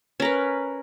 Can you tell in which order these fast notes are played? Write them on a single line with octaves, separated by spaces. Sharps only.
C#4 A#4 B4